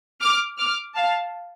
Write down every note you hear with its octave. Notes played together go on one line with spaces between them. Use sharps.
D6 F6
D6 F6
F5 A5